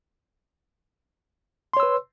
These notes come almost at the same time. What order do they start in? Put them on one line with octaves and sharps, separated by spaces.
C6 C#5 E6 B4